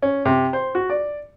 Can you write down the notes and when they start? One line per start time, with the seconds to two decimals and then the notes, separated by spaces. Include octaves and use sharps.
0.02 C#4
0.25 C3
0.53 C5
0.75 F#4
0.90 D5